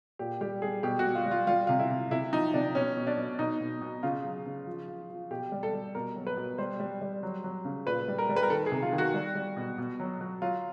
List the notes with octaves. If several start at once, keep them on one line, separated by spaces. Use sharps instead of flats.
A#2 G4
G3 G4
G3 G#4
B2 G4
F#4
G3
F4
G3
F4
G3 F4
C3 F4
E4
C3
C3 E4
F3 D#4
C3 D4
B2 C#4
B2
D4
B2
B2 D#4
B2
B2
C#3 F4
F#3
C#3
F3
F3
F3
B2 G4
G3
A4
G3
B2 A#4
F#3
B4
B2
G3 C5
G3
G3
F#3
F#3
C#3
A#2 B4
G3
A#4
G3
B4
A#4
D#3 A4
G#4
C3
F4
D#3
F#4
G3
G3
B2
B2
F#3
F#3
F#3 F4